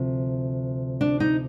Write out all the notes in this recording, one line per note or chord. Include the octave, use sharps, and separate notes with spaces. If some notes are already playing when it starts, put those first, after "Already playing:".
Already playing: D2 C3 F3
D4
D#4